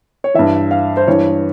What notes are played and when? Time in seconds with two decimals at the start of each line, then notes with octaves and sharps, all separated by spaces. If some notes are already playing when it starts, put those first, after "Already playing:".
0.24 C#5
0.34 G2 E3 E5
0.71 F5
0.97 C5
1.08 G2 E3 C#5